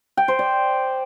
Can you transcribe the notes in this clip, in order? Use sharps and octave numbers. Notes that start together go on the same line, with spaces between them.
G5
C5
D5